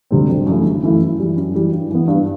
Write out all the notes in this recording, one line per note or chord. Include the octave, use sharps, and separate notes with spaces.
D2 C3 G3 C4
G1
F#2 E3 A3 E4
G1
F#2 E3 A3 E4
F#2
E3 G3
F#2
E3 G3
G2
E3 B3
G2